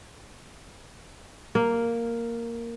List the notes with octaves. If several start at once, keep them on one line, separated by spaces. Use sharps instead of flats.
A#3